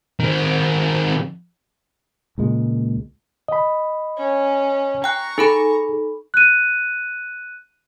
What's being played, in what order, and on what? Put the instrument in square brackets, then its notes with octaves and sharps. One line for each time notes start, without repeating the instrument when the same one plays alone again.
[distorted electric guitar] D#3 C4
[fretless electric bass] C#2 A#2 G#3
[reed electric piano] D#5 B5
[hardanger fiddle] C#4
[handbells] G5 F#6 [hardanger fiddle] A#5 C#6
[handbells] D#4 A4 B5 [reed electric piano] G#4
[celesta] F#6 D#7